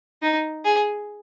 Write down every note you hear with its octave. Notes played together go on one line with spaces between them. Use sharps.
D#4
G#4